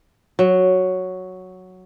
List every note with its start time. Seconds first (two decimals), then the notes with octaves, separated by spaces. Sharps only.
0.39 F#3